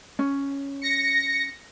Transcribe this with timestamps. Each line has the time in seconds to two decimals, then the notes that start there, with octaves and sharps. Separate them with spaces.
0.19 C#4
0.82 A#6 C#7